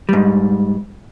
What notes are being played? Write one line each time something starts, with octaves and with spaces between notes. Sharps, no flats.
G#2 G3